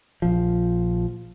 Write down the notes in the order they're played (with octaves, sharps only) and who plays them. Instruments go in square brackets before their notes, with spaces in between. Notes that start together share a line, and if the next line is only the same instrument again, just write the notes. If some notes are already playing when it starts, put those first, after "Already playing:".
[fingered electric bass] A#1 F3